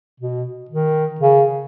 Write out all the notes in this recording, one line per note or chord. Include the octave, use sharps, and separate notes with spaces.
B2
D#3
C#3